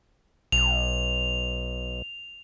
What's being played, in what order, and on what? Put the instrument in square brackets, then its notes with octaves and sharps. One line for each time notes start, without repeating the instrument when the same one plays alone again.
[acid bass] B1 [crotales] F7